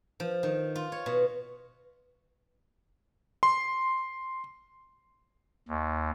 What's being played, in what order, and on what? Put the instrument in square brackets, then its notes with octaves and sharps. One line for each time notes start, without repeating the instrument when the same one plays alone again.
[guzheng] F3
D#3
F4
C#5
B2
[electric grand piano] C6
[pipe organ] D#2